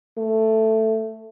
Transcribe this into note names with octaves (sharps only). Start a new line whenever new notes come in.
A3